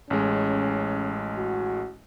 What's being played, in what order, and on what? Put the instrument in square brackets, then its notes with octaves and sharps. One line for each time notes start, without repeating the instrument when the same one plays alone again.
[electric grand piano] A1 G#3 [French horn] C#4
[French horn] F#4